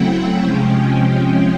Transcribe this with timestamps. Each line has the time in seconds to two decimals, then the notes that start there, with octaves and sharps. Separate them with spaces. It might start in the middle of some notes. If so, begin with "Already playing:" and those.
Already playing: C#3 F#3 A3 C4 E4 F#5 G5
0.39 C3 F3 G#3 C#4